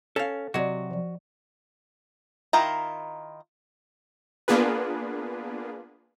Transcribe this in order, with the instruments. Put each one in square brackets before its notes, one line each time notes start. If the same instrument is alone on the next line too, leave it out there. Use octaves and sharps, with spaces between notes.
[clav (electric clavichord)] C#4 [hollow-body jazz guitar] A4 F5
[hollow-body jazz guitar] C3 F#3 [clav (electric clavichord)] F#4 [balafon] D5 D#5
[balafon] F3 D5
[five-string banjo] D#3 E4 F4 A#5
[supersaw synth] A#3 B3 D4 F4 G#4 B4